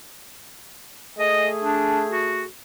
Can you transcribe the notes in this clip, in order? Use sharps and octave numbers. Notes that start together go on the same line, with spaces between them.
A3 G#4 D#5
D4
F#4